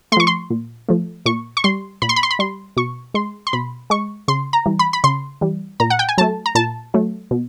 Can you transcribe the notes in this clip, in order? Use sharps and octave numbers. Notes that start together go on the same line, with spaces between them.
F3 A3 C6 C#6
C6
A#2
F3 A3
A#2 C#6
C#6
G3 C6
A#2 B5
C6
B5
C6
B5
G3 C6
B2 C#6
G#3 C6
C6
B2 B5
G#3 C#6
C#3 C6
A#5
E3 G3
B5
B5
C#3 C6
E3 G3
A#2 A#5
F#5
G5
G#5
F#3 A3 A5
A#5
A#2 A5
F#3 A3
B2